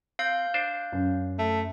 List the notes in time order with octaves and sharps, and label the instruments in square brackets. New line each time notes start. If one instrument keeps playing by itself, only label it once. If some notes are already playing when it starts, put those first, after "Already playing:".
[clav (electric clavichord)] C4 [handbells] F5 G6
[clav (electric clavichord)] D4 C5
[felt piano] F#2
[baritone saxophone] A3